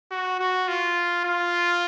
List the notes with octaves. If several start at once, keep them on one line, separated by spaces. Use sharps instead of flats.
F#4
F#4
F4
F4